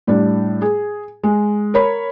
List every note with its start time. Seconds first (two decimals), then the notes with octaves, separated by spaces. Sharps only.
0.07 A2 G3 D4
0.62 G#4
1.24 G#3
1.74 A#4 C#5 B5